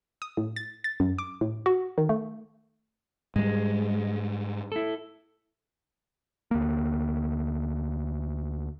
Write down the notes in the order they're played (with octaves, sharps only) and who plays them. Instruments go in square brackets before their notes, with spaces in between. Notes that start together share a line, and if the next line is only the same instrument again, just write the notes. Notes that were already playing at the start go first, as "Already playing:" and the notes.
[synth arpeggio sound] D#6
A2
A6
A6
F#2
D6
A2
F#4
D#3
A3
[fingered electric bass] G#2 G3 [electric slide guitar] G#3
[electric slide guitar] E4 A4
[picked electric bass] D2 A#3